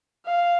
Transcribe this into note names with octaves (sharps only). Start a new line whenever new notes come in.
F5